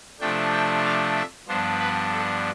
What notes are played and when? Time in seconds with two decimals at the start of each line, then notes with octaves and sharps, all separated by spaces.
0.20 C3 F3 A3 D4 G5
0.52 G5
0.84 F5
1.16 E5
1.48 G2 F3 B3 D4 C5
1.80 B4
2.12 A4